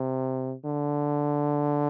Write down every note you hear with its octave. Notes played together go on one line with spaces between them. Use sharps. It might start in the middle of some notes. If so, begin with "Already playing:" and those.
Already playing: C3
D3